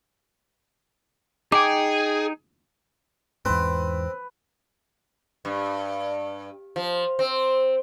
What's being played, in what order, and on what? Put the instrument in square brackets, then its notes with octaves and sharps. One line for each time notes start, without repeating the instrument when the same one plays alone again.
[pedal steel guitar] D#4 G5 [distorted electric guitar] G#4 [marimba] D6
[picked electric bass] E2 G#2 [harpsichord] C4 [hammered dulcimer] B4
[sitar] G2
F3
C4